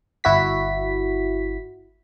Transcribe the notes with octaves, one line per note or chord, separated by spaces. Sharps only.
G1 E4 F#4 B6